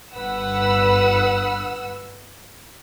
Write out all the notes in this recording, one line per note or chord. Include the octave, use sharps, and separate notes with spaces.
G1 B4 F#5 E6